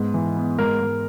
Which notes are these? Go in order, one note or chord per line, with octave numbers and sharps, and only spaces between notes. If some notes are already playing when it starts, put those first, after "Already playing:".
Already playing: G#2 B3
E3
B3
G#2 A#4
G#2